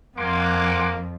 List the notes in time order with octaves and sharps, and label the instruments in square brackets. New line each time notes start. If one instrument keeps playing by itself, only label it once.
[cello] F2 [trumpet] A#3 [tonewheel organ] F#5 G#5 D6 [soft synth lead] C6